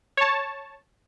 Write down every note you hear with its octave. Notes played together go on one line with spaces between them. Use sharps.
C#5 A5